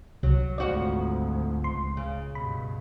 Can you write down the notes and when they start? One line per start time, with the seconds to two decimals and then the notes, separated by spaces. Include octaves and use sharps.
0.23 C2 F#3
0.58 G#1 D2 F3 F#4 D5
1.64 C#2 C6
1.97 C#3
2.35 G2 B2 B5